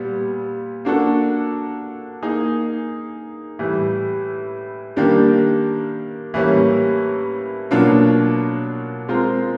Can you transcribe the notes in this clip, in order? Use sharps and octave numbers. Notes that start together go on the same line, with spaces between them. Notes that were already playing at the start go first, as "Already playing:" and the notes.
Already playing: A#2 G3 B3
A#3 D4 F#4 A4
A#3 D#4 G#4
A2 E3 G3
D#3 G3 A#3 D4 G4
A2 E3 G3 A#3 C#4
B2 F#3 A#3 D4 F4
G#3 C4 F4 A#4